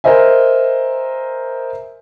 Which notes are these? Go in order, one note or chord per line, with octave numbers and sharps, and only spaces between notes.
A#4 C5 D#5 E5 G#5